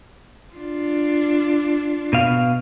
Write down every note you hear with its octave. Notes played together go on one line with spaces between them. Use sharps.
D4 F4
B2 F5